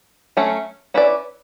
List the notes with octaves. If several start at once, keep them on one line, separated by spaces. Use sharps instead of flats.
F#3 A3 C#4
C#4 E4 B4 D5